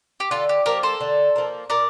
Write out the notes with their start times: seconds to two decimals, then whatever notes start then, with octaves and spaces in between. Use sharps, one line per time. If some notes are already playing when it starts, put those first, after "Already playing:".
0.20 G4
0.31 D3 F4 A4
0.49 G4
0.66 F3 A#3 G4 A#4
0.83 A4 C5
1.01 D3
1.36 F3 A#3
1.70 A#2 A#4 D5